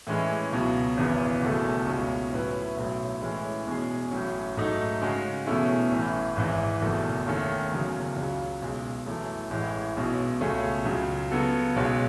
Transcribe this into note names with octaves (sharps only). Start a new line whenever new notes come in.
A2 E3 G#3 C#4
C#2 B2 F#3
G#1 F#2 C#3 E3 B3
F#1 E2 B2 A3
C#2 B2 G#3 C#4 E4
A2 F#3 C#4 E4 B4
B1 A2 F#3
A2 E3 G#3 C#4
E2 B2 G#3 C#4 G#4
A1 A2 F#3 C#4
G#2 F#3 A3 D#4
C#3 G#3 C#4 F#4
E2 B2 A3 C#4 E4
A1 A2 E3
G#1 G#2 E3
F#1 E2 B2 A3
D#2 D#3 A3 C#4 G#4
F#1 E2 C#3 F#3 C#4
C#2 C#3 F#3
B1 B2 G#3
F#2 E3 A3 E4 A4
A1 A2 E3 G#3
B1 B2 G#3 C#4
C#2 B2 A3 C#4 G#4
C#2 C#3 F#3
C#3 F#3 B3 F#4 A4
B1 B2 G#3 C#4 F#4